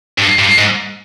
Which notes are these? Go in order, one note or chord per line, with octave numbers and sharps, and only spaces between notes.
G2
G2
G#2